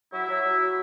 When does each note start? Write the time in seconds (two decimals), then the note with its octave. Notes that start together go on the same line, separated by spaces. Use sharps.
0.12 F#3 E4 E5
0.29 F#3
0.44 F#3